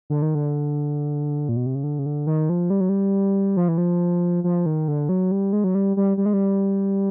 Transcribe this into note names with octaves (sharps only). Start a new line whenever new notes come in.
D3
D#3
D3
A#2
B2
C3
C#3
D3
C#3
D3
D#3
F3
G3
F#3
G3
F3
E3
F3
F3
D#3
D3
F#3
G3
G#3
F#3
G3
G3
G3
G#3
G3